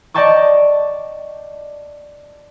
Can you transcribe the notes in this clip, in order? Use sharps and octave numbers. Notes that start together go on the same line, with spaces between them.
D5 D#5 G5 A5 C#6 D6